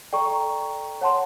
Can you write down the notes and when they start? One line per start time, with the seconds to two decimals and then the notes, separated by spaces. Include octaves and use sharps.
0.13 A4 D5 G5 A#5 C#6
1.01 C#5 F#5 A5 C6